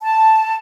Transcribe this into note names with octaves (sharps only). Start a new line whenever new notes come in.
A5